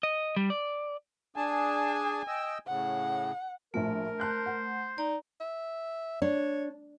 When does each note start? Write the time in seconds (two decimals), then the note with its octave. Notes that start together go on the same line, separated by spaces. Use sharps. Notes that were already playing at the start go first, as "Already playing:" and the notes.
0.03 D#5
0.36 G3
0.50 D5
1.36 D4 G#4 G#5 A5
2.27 D#5 G5 E6
2.67 A2 C#3 F#5
3.74 A#1 A2 F3 A3 A#4
4.20 C5 A5 F#6 G6
4.46 F#5
4.98 D#4 D5
5.40 E5
6.22 D4 C#5